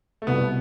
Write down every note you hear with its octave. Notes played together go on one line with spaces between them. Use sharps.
A3
C2 B2 G3 B3